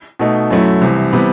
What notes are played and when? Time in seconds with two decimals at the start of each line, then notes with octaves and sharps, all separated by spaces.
0.19 B2 A3 D#4
0.51 F#2 F#3 A3 E4
0.81 C2 C3 E3
1.12 C3 E3 G3 B3